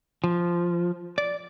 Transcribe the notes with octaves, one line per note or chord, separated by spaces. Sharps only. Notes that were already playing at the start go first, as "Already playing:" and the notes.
F3
D5